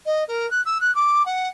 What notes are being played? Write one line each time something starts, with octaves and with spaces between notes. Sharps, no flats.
D#5
A#4
F#6
E6
F#6
D6
F#5